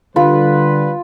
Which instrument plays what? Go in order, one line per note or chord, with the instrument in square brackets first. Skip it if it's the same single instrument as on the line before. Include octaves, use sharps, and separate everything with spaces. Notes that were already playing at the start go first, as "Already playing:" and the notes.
[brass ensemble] D3 G3 B4 [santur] F4 B5 C#6